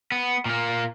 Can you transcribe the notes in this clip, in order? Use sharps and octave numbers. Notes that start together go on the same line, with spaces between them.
B3
A#2 A#3